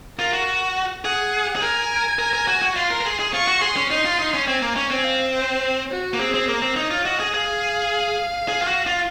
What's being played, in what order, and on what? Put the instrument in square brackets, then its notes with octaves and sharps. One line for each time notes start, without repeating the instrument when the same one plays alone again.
[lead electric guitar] F4 [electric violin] A#4
[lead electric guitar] F#4
[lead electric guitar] G#4 [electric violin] F#5
[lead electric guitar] G#4
[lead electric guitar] A#4 [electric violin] G#5
[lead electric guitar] A#4
A#4
F#4
F#4
[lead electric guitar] F4 [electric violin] C6
[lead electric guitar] A#4
A#4
G#4
G#4
[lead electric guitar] F4 [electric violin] C#6
[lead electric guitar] F#4
[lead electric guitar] G#4 [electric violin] C6
[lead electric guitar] C#4
[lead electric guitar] D#4 [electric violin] C6
[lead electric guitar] F4
D#4
C#4
[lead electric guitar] C4 [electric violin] G#5
[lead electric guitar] A#3
[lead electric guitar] C#4 [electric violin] G#5
[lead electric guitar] C4
[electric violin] F5
C5
F#4
[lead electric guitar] A#3
[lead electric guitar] C4 [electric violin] G#4
[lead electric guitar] C4
[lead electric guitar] A#3 [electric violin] A#4
[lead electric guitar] C4
[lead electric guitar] D#4 [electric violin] C#5
[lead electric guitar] F4
[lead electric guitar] F#4 [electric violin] D#5
[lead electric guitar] G#4
[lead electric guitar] G#4 [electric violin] F5
[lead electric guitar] G#4
F4
F#4
F4